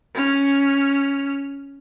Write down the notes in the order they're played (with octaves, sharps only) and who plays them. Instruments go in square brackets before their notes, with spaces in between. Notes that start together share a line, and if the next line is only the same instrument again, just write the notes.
[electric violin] C#4 F6